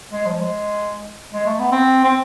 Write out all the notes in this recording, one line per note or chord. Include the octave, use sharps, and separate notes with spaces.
G#3
F3
G#3
G#3
A3
B3
C4
C4